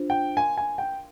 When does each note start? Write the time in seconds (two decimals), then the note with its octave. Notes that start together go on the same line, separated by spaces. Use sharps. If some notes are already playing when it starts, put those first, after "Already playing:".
Already playing: D4 F4 C5
0.10 G5
0.37 A#4 F5 G#5 C6
0.58 G#5
0.78 G5